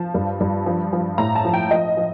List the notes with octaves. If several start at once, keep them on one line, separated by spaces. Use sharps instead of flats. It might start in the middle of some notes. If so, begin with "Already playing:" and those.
Already playing: F3 A5
G2
G2
F3
F3
A2 A#5
A5
F3
G5
F3 D#5
F3